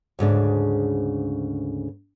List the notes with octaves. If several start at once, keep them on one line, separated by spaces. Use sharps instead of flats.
D2 G#2 C#3 D4